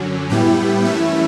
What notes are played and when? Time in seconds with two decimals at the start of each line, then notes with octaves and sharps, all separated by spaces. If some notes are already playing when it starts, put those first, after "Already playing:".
Already playing: F#2 D3 F#3 C#4
0.30 A2 G3 B3 E4 G4 G5
0.85 F#2 E3 A3 C#4 E4 E5